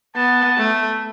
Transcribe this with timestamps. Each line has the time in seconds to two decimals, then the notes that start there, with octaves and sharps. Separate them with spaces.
0.16 B3 A5
0.58 A3